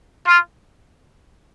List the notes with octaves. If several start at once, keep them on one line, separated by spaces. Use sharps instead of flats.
F4